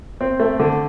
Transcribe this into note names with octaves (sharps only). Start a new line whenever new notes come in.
C4
A3
D3